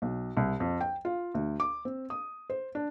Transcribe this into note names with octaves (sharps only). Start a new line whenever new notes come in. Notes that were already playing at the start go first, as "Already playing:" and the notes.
B1
C2
F2
G5
F4
D2
D6
C4
D#6
C5
D4